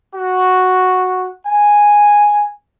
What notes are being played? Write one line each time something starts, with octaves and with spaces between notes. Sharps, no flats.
F#4
G#5